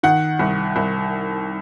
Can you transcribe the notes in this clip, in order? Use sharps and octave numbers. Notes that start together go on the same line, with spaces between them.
D#3 F#5
C2
C2